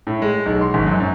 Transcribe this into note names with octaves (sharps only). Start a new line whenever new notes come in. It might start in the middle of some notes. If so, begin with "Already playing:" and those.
A2
G#3
B1
C6
G#1
F#2
F#2